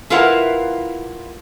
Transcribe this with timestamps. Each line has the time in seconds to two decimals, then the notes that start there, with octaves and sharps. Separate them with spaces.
0.10 E4 F4 A#4 B4 F5 F#5